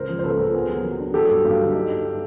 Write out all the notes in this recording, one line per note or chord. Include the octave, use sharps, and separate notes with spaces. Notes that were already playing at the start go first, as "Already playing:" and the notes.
Already playing: C#2 A#4 C5
F3
C5
C#2 A4 B4
C#2
B3 G#4 A#4
F#3
F#3
D4
F#3 G4 A4
G2
G2
D3
D#4
D#4
D#4